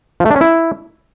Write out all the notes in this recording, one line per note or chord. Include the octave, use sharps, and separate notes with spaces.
F3
A3
D4
C#4
E4